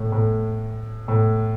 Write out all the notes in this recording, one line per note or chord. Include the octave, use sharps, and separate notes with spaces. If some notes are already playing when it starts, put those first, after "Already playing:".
Already playing: A2
A2
A2